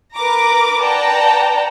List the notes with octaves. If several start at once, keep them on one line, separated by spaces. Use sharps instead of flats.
A#4 B4 A#5 D6
B4 D5 F#5 G5 A5 A#5